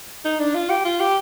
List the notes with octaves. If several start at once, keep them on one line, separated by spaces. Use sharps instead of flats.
D#4
D4
F4
G4
F4
G4